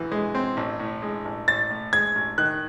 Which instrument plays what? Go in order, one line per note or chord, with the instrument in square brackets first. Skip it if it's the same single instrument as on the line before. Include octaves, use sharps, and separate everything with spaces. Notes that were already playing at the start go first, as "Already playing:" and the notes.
Already playing: [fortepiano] F#2 E3
G#3
C4
A1
A2
G#3
A1
[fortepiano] A1 [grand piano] A6
[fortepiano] A2
[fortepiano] G#3 [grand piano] G#6
[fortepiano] A1
[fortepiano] D#3 [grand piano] F#6